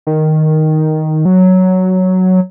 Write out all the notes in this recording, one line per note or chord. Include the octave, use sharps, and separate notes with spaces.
D#3
F#3